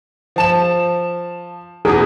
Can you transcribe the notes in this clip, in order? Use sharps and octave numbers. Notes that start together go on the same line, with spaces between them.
F3 A5 E7
E2 B2 G#4